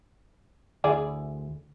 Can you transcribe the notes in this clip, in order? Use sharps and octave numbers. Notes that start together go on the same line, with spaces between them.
D2 E4 G#4 D5